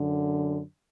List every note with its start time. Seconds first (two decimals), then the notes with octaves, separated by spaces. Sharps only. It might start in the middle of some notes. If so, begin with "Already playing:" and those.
Already playing: F#2 D3